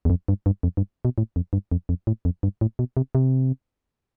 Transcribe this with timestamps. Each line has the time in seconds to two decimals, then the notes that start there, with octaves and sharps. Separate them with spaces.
0.05 E2
0.10 F2
0.28 G2
0.46 G2
0.63 F2
0.77 G2
1.05 B2
1.18 A2
1.36 F2
1.53 G2
1.72 F2
1.89 F2
2.07 A2
2.25 F2
2.43 G2
2.61 A2
2.79 B2
2.97 C3
3.15 C3